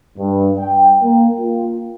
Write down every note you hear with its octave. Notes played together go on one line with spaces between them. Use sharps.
G2
G5
A#3
F4